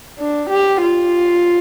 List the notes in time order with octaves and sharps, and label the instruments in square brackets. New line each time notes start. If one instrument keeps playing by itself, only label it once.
[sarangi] D4
G4
F4